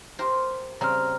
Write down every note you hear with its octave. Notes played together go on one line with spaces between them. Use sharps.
G4 A#4 C5
C#3 G3 C4 A#5 F6